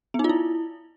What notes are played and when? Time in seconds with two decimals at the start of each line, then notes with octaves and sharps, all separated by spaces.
0.14 B3
0.19 D#4
0.24 F4
0.29 E4